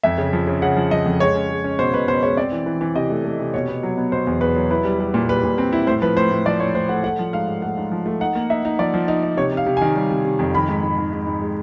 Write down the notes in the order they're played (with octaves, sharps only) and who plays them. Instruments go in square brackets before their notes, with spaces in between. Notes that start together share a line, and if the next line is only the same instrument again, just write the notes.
[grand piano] F2 E5
C#3
F3
C#3
C#3 F#5
F3
F3 D#5
F2
G#3 C#5
C#4
G#3
C#4
B2 C5
B2 B4
B2 C5
G#3 C#5
C4 D5
E3
E3
E3
C3 D#5
A3
A3
C3
B2 C#5
B3
F#3
B3
B2 C5
E2
E2 B4
F#3
E4 B4
G3
G3
A#2
G3 B4
A#2
C4
E4
A2 C5
F3 B4
A2 C5
A2
F3 D5
A2 C#5
A2 C5
A3 F#5
A3 F#5
F3
G#2 F5
G#2
A3 F#5
G#2
F3
A3
D#4 F#5
A#3
D#4 E5
D#4
F3 D5
F3
D#4
D#4
C3 C#5
C3 F5
C3
D#3 G#5
G3
C3
C3
F2
D#3 B5
G#2
G#2
D#3
G#2
G#2
G#3